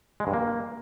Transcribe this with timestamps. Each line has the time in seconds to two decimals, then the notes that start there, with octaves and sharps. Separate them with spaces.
0.20 G#3
0.27 G2
0.34 A#3